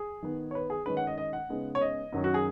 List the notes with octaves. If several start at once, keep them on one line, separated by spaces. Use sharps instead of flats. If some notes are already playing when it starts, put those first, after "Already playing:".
Already playing: G#4
D#3 B3 D#4
C#5
B4
G#4
D#3 G#3 C#4 B4
F#5
D#5
D#5
F#5
C#3 G#3 B3 D#4
C#5
D#5
F#2 D#3 F#3 C#4
F#4
G#4